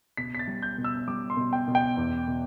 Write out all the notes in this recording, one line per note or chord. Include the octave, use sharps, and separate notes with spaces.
B2 B6
B6
A6
G3
G6
B2
E6
G3 D6
C6
B2
G5
B2
G5
E2
B2